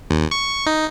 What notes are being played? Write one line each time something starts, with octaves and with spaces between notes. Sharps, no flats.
D#2
C#6
D#4